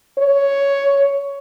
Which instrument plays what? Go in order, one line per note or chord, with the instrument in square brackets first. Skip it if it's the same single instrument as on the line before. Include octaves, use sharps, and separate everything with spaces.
[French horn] C#5